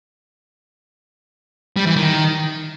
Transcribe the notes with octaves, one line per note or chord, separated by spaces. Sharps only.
G3
E3
D#3